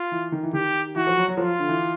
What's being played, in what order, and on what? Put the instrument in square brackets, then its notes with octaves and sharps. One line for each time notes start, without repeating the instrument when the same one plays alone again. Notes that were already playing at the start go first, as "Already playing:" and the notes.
Already playing: [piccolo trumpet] F4
[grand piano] E3
D#3
E3
[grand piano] D#3 [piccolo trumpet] G4
[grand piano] E3 [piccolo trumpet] F#4
[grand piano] F3
F#3
F#3
[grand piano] F3 [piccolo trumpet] F4
[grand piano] D3
E3